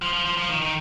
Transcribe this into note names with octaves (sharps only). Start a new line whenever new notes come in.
F3
F3
F3
F3
D#3
D#3